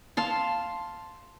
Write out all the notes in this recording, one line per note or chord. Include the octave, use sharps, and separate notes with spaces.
F5 A5 C6